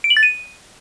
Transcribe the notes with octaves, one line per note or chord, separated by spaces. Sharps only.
D7
F#7
A6
D#7